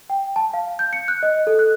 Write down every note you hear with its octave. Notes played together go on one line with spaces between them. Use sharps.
G5
A5
F5
G6
C#7
F#6
D#5
A4
F#6